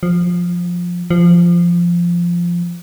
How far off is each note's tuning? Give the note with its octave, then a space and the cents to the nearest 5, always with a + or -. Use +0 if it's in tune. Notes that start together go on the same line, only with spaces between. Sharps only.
F3 +10
F3 -10